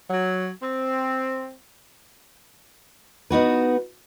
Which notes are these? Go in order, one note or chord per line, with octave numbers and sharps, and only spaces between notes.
F#3
C4
B3 D#4 F#4 B4